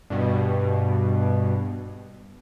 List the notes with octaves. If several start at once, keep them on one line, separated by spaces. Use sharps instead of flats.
G2 B2